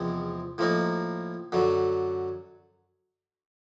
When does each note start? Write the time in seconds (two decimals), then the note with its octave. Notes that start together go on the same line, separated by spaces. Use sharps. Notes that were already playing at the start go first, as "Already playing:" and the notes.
Already playing: E2 C3 F3 G#3 C4
0.58 A2 F3 A#3 D#4
1.52 F#2 D3 F#3